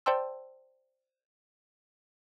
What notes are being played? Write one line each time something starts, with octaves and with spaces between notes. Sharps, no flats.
C5 D5 G5 A5 C6 E6